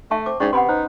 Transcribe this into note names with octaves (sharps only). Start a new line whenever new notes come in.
A3 E5 A5 C#6
C4 D6
G#2 C#4 D4 C#6
C3 B3 F#5 B5 C6
D#4 C5